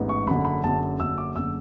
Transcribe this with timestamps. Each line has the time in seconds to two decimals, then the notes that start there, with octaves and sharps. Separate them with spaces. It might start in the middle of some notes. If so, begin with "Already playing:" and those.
Already playing: A1 G#2 G#3 B3
0.09 C#6
0.26 F#1 F#2 D3 B5
0.45 B5
0.63 F#1 F#2 D3 A5
1.00 F#1 F#2 D3 E6
1.18 D6
1.35 F#1 D3 E6